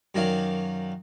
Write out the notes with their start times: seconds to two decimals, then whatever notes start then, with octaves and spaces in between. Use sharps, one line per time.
0.15 F#2 D#3 F#3 D5 F5